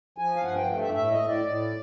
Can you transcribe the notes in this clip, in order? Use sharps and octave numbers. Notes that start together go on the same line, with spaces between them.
F3 G#5
F5
G2 F#5
G5
A3
E5
A2 E5
D#5
A2
D5
A2